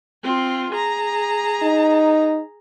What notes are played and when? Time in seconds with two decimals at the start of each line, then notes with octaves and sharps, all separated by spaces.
0.24 C4 F4
0.72 G#4 A#5
1.63 D#4